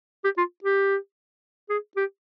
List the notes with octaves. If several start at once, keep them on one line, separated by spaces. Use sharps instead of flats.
G4
F4
G4
G#4
G4